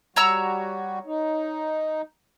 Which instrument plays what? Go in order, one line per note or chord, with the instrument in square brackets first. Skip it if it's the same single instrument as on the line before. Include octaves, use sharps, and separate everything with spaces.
[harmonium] G3 F#4 [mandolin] C#5 A#5 E6
[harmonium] D#4